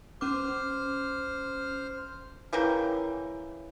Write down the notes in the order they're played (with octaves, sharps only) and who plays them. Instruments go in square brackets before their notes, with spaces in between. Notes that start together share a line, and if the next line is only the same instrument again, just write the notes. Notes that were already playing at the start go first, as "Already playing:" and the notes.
[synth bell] C#4 D6 [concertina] C5 F6
[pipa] C#3 E3 A#4 G5